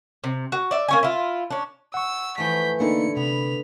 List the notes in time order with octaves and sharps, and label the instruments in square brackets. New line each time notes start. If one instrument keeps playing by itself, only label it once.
[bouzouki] C3
F#4
D5 E5
A#3 C#4 G#5
E4 F4
C#4 D4
[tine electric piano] F#5 C#6 [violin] E6
[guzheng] E3 F3 A3 [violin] G6 B6
[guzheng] D3 E4 [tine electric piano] A#3 D#4 A4 [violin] C#7
[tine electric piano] C3 [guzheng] B3 [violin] B5 F7